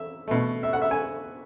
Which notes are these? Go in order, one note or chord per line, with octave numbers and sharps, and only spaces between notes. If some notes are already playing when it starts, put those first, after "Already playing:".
Already playing: E5
B2 A3
E5
F#5
E5
G#5